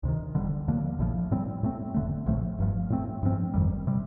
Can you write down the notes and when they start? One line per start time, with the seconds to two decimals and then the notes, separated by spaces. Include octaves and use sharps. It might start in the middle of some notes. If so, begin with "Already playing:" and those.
0.03 D2 C3 D#3
0.35 F1 F2 D3 G3
0.68 D#2 D3 F3 A#3
0.99 A#1 A2 F3
1.31 A2 G3 C4
1.63 A2 A3 C4
1.94 F1 D#2 D3 A3
2.26 A#1 A2 F3 A3
2.58 G1 G2 F3
2.90 A2 A3 C4
3.23 G2 F3 C4
3.54 G1 F2 D#3 G3
3.87 C3 G3